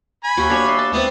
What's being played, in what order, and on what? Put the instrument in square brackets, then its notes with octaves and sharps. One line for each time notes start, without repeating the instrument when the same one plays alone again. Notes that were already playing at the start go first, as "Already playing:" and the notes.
[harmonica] G#5 B5
[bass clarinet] D#2 [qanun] F#4 G5
[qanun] D4 C#5
E5 C6
A5
[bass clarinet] A3 [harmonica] B3 [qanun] C4 A5